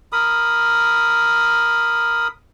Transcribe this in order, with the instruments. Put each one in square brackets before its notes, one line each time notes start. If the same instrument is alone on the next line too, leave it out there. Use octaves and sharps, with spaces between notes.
[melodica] A#4 B5 D#6